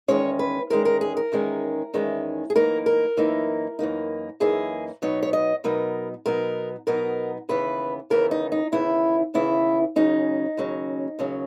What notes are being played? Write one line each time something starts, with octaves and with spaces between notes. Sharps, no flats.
E2 D#3 G#3 C#4 C#5
B4
E2 D#3 G#3 C#4 A#4
A#4
G#4
A#4
E2 D#3 G#3 C#4
E2 D#3 G#3 C#4
G#4
F#2 E3 A#3 D#4 A#4
A#4
F#2 E3 A#3 D#4
F#2 E3 A#3 D#4
F#2 E3 A#3 D#4 G#4
B2 F#3 B3 D#4 C#5
C#5
D#5
B2 F#3 B3 D#4 A#4
B2 F#3 B3 D#4 A#4
B2 F#3 B3 D#4 A#4
D#2 C#3 E3 B3 B4
D#2 C#3 E3 B3 A#4
D#4
D#4
D#2 C#3 E3 B3 E4
D#2 C#3 E3 B3 E4
D#2 C#3 F#3 C#4 D#4
D#2 C#3 F#3 C#4
D#2 C#3 F#3 C#4